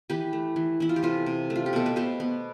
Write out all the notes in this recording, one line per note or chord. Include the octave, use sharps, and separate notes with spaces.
E3 G4 B4
A3
E3
E3 E4
F4
G4
C3 F4 A4
C3
A3
F4
G4
B2 A4
B4
B2 A4 C5
B3